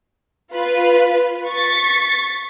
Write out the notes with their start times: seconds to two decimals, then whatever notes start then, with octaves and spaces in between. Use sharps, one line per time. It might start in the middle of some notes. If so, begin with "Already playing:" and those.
0.51 F4 B4
1.47 C#6 A6 B6